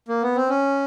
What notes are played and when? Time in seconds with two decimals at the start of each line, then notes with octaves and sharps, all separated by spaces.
0.08 A#3
0.22 B3
0.36 C4
0.49 C#4